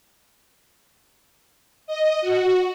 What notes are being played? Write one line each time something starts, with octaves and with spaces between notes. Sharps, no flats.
D#5
F#4